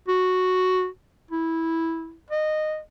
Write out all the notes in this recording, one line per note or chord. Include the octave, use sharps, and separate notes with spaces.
F#4
E4
D#5